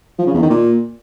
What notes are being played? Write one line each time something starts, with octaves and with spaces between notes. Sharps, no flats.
F3
C#3
E2
D#3
A#2